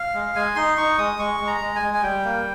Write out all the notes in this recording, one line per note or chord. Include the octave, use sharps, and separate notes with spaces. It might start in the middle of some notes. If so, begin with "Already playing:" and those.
Already playing: F5
G#3
G#3 G#5
D#4 C6
D#4 C#6
G#3 D#6
G#3 C#6
G#3
A#5
G#3
G#5
G#3
G#5
G3 G5
A#3